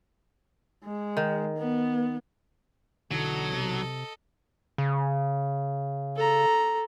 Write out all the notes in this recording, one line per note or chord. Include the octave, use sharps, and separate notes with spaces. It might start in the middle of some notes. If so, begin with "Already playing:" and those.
G#3
D#3
B3
B1 D3 E3 F#3 B3 A4 D#5
C3
C#3
A4 A#5